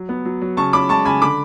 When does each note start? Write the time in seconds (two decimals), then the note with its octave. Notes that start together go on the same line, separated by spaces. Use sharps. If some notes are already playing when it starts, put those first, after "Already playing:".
Already playing: F#3
0.09 B3
0.25 F#3
0.41 F#3
0.57 C#3 A5 C#6
0.73 C#4 B5 D6
0.89 G#3 A5 C#6
1.05 C#3 G#5 B5
1.21 D3 B5 D6